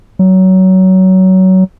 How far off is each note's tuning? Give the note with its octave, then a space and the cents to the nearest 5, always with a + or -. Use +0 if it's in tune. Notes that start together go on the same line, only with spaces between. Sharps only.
F#3 +20